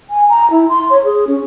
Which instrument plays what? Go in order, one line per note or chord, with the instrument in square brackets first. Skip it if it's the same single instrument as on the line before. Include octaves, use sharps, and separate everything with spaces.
[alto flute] G#5
A#5
E4
C6
C#5
G#4
C#4